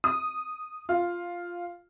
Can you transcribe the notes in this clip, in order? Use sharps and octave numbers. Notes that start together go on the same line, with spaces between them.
D#6
F4